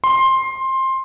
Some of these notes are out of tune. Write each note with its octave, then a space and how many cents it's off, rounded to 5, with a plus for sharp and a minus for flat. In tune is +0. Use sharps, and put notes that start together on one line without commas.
C6 +15